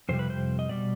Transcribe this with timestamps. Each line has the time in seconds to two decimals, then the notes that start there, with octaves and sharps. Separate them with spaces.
0.09 F2 C3 G3 C5
0.19 B4
0.30 C5
0.59 D#5
0.69 B2 G3 D5